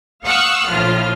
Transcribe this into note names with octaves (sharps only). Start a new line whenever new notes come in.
F5 F#5 C#6 D#6 E6 F#6
A#1 A2 F3 F4 F6